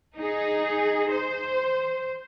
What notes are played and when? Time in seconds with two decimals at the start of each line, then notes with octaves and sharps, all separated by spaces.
0.16 D#4 G#4
1.11 C5